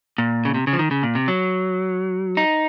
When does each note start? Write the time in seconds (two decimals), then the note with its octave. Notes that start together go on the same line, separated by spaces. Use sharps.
0.18 A#2
0.45 C#3
0.54 C3
0.67 C#3
0.73 F3
0.79 D#3
0.91 C#3
1.03 A#2
1.15 C3
1.28 F#3
2.37 D#4